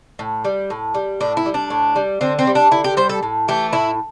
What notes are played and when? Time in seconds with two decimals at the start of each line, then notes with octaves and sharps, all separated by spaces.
0.19 A2
0.45 G3
0.70 A2
0.95 G3
1.21 A2 D4
1.37 E4
1.46 G3
1.54 D4
1.70 A2
1.96 G3
2.21 D3 C4
2.39 C4
2.47 G3
2.55 D4
2.71 D3 E4
2.84 G4
2.97 G3 C5
3.09 A4
3.23 A2
3.48 E3 A3 G4
3.73 A2 E4